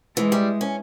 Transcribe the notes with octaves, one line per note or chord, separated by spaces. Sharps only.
E3 G#3
G3
C#4